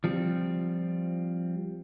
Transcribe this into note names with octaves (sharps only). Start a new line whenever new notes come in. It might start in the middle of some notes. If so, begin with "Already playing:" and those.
F3 G3 C4